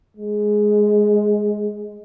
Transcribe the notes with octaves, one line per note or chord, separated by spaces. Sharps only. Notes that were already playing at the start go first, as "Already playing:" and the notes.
G#3